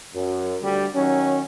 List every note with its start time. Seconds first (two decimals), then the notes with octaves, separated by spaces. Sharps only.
0.15 F#2
0.63 D2 D3 G3
0.95 D#3 F#3 C#4